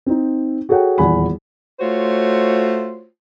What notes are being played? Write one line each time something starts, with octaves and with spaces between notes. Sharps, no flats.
C4 D#4
F#4 G#4 A4 C#5 F#5 G5
D#1 E2 F#5 G#5 B5
A3 F4 F#4 C5 C#5